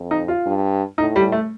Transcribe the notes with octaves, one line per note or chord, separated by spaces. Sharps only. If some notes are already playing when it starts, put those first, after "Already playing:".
Already playing: F2
D#4
F4
G2
A2 D#4
G3
A3